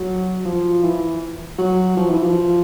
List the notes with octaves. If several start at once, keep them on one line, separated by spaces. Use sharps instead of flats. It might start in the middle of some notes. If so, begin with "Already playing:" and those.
Already playing: F#3
F3
E3
F#3
F3
E3
F3